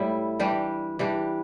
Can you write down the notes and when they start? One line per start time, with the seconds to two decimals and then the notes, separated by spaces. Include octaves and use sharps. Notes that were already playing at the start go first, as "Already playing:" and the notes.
Already playing: A2 G3 E4
0.40 E3 G3 D4 G4
0.99 E3 G3 D4 G4